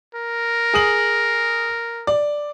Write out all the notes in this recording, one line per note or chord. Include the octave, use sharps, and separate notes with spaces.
A#4
G#4 D#6 F#7
D5